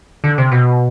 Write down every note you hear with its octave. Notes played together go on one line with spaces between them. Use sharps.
D3
C3
B2